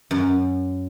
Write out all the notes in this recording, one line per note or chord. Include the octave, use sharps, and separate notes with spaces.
F#2